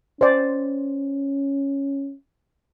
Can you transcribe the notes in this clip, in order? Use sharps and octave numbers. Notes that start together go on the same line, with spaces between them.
C#4 C5 D5